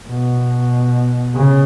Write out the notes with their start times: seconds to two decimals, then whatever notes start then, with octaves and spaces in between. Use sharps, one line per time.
0.08 B2
1.36 C#3